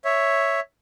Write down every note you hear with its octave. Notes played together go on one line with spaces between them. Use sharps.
C#5 E5